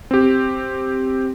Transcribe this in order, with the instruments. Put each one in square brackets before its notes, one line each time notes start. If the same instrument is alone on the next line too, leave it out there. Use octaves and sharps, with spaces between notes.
[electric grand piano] C4 G4